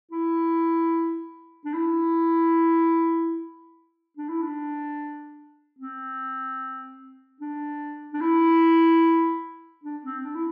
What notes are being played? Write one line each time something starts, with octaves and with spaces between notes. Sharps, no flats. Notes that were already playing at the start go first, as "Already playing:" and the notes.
E4
D4
E4
D4
E4
D4
C4
D4
D4
E4
D4
C4
D4
E4